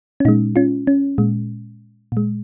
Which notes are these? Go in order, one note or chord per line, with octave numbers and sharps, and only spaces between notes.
C#4
A#2 G#3 D#4
C#4 F4
C#4
A#2 G#3
A#2 G#3